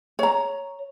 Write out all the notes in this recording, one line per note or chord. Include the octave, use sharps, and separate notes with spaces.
C#5 A#5